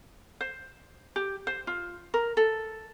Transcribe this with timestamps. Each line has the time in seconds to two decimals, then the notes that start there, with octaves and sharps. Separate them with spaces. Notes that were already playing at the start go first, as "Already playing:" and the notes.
0.41 C5
1.16 G4
1.47 C5
1.67 F4
2.14 A#4
2.37 A4